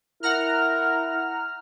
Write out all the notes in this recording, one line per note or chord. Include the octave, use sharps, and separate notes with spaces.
E4 A#4 F#5 A#5 F6